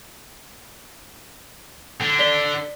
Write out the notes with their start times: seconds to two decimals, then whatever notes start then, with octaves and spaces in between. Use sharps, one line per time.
2.00 D3
2.19 D5 B6 G7